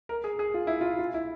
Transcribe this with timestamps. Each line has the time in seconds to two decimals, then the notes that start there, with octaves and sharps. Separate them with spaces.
0.09 A#4
0.24 G#4
0.39 G#4
0.54 F4
0.67 E4
0.81 F4
0.99 F4
1.14 E4